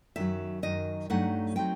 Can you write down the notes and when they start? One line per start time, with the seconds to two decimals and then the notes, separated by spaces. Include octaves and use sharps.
0.16 F#2 D#3 F#3 E5
0.63 F#2 D#3 F#3 D#5
1.10 G2 F#3 A3 D#4 F#5
1.56 F#3 A3 C4 D#4 G5